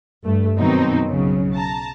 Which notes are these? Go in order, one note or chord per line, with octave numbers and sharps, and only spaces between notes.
G2 A3
F#2 B2 D#3 F#3 C4 D#4
B1 C#3 F#3
A5 A#5